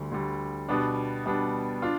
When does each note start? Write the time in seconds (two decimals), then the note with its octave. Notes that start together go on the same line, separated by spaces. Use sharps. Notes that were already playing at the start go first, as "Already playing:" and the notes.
Already playing: D2 D3 G3
0.12 D2 D3 G3
0.68 B2 G3 B3 D4
1.26 B2 G3 B3 D4
1.82 D4 F4